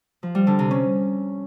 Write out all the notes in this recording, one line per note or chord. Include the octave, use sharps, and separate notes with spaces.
F3
G3
D3
C3
C#4